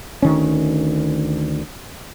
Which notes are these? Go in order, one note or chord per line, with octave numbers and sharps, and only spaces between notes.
D2 D#3 C#4